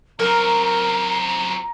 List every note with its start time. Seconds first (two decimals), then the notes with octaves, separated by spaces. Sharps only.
0.19 F#3 C4 A#4 A#5